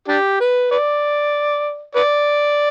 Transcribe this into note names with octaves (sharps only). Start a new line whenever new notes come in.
D4 G4
B4
B4 D5
B4 D5